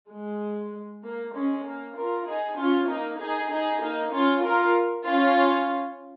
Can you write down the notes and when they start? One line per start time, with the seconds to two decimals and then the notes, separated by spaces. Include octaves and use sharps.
0.11 G#3
1.03 A#3
1.34 G#3 C#4
1.65 A#3
1.96 F4 A#4
2.27 D#4 G#4
2.57 C#4 F4
2.88 A#3 D#4
3.19 D#4 G#4
3.50 D#4 G#4
3.81 A#3 D#4
4.12 C#4 F4
4.43 F4 A#4
5.04 C#4 F4